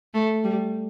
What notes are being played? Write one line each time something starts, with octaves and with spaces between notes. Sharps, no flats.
A3
G3